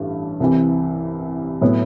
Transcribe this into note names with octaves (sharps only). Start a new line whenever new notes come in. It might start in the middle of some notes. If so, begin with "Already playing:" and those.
Already playing: A1 G2 A3
C2 C3 E3
A2 F#3 B3 E4